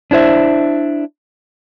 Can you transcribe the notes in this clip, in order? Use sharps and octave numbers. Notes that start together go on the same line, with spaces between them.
D4 E4 C5 E5